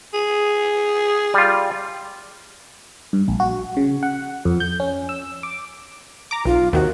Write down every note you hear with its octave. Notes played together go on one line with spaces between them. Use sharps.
G#4
G3 F4
G2
A#1
F#4
C#3
F#5
F2
G6
C#4
E6
D6
A#5 D6
B1 F4
D#2 C3 D#3 F#4